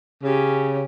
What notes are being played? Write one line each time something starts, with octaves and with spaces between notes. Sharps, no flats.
C#3 C#4 G4